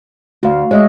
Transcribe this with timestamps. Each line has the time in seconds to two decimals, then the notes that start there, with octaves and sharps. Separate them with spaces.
0.43 D2 F#4 F5
0.71 G#3 C#5 D#5 E5